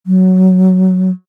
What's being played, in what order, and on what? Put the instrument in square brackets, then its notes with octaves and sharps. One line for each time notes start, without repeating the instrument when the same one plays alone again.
[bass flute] F#3